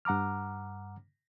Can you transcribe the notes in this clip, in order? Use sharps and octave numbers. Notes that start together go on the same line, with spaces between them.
G2 F#5 A#5 D6 F6